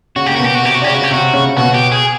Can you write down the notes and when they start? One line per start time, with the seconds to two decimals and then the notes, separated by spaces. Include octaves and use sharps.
0.16 C#3 C#4 F#4
0.26 A#3 G4
0.36 B2 B3 F#4
0.45 G4
0.55 F#4
0.63 C3 C4 G4
0.75 F#4
0.82 D4
0.84 C#3 C#4 G4
0.94 F#4
1.04 G4
1.10 C3 C4 F#4
1.33 C#3 C#4
1.57 B2 B3 F#4
1.74 G4
1.92 G#4